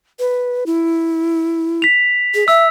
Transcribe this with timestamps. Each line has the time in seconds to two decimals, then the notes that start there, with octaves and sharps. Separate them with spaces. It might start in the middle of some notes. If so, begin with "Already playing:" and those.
0.19 B4
0.66 E4
1.82 B6 F7
2.35 G#4
2.48 E5 E6